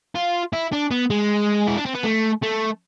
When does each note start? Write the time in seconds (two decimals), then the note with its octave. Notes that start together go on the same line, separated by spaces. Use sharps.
0.15 F4
0.53 E4
0.72 D4
0.91 B3
1.10 G#3
1.67 E4
1.75 D4
1.86 C4
1.95 B3
2.04 A3
2.42 A3